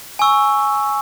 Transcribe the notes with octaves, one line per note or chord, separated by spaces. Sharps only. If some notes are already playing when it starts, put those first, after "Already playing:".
G#5 C#6 E6